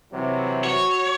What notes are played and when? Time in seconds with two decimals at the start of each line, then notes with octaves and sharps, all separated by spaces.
0.12 C3 E3 F#3
0.64 F#4 C#5